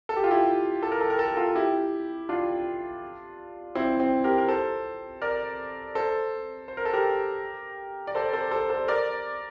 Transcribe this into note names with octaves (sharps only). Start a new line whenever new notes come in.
A4
G4
F4
E4 G4
A4
A#4
A4
A#4
A4
A#4
F4 A4
E4 G4
D4 F4
C4 E4
C4
G4 A#4
A#4
A4 C5
A#4 D5
A4 C5
C5
A#4
A4
G4 A#4
D5
A4 C5
A4 C5
A4 C5
A4 C5
A#4 D5